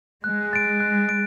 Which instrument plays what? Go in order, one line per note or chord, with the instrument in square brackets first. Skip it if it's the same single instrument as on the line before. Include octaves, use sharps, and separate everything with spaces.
[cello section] G#3 [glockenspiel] F#6
[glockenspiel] A6 D7
F#6
A6 D7